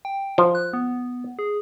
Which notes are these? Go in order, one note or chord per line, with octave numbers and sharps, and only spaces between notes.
G5
F3
F#6
B3
G#4